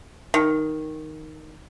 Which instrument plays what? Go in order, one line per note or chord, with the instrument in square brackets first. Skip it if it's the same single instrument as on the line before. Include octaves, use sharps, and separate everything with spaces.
[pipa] D#3